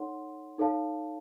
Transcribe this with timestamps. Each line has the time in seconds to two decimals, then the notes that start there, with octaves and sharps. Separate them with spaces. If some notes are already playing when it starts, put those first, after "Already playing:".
Already playing: D#4 A4 C#5 F#5 C6
0.58 D#4 A4 C#5 F5 A5